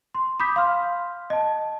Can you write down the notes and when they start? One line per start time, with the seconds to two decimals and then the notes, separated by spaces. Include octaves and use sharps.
0.14 C6
0.40 B5 D6 D#6 G6 B6
0.56 F5 C6 F6
1.30 D#5 A5